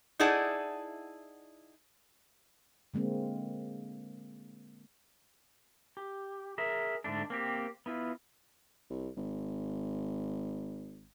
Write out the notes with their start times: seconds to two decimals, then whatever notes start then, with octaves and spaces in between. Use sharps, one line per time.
0.19 D#4 E4 G#4 D5 F#5 A5
2.94 D3 G#3 A#3 C4
5.97 G4
6.58 G#4 A#4 E5
7.04 G#2 D3 A3 D4
7.30 A#3 C4 G4
7.86 B3 E4 F4
8.90 C2
9.17 G#1